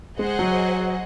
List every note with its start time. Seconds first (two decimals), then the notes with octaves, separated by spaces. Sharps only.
0.19 G#3 G#4 C5 D#5 F#5
0.39 F#3